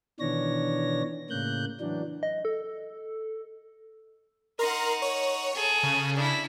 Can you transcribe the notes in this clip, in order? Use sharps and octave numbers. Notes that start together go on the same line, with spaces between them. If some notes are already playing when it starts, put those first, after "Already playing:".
B2 D#3 E3 D4 C#5 A#6
A2 C#3 A#3 F#6 G6
E3 F#3 D4
D#5
A4
D#4 A#4 F#5 A#5 C6
C#5
G#4 A4
C#3
D4 E4